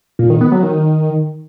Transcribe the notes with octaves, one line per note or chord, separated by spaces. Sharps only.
A#2
D#3
B3
F#3
D#3